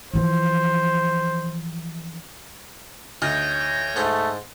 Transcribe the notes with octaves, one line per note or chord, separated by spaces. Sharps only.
E3 F3 C5
D2 D#4 C#5 G6 A#6
G#2 A3 D#4